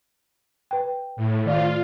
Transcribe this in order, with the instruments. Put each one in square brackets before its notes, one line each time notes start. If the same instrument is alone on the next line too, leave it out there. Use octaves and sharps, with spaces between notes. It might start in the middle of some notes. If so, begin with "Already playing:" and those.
[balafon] B4 G5
[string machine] A2
[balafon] D#3 D5 F5 [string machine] F4